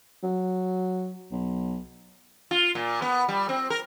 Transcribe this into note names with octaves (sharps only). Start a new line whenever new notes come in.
F#3
B1
F4
A#2
B3
G3
C4
A#4